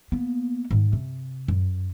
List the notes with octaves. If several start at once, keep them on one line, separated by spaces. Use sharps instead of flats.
A#3 B3
G#2 D#3
C3
F#2